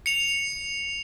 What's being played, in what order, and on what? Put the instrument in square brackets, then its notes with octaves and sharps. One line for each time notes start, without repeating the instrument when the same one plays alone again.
[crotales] C#7 F7